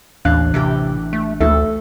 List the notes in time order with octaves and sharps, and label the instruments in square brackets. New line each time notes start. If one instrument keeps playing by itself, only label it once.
[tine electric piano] A1 D4 F#6 [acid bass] D#2 [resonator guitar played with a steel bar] F5
[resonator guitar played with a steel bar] A2 E3 G4 [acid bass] C3
[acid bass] A3
[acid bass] D2 [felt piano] A3 E5 [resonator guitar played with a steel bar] A4